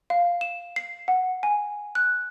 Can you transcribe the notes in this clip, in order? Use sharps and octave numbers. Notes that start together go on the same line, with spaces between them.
F5
E7
C7
F#5
G#5
F#6